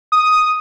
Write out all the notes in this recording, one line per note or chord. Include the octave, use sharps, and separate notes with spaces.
D#6